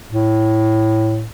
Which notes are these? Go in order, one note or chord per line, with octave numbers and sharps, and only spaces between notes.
A2